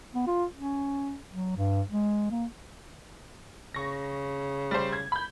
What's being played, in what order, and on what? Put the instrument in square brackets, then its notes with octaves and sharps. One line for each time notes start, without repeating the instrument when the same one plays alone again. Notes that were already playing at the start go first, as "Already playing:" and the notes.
[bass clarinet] B3
F4
C#4
F#3
G2
G#3
A#3
[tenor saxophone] C#3 [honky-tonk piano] C#6 A#6
[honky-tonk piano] G3 C5
G#6
B5 G6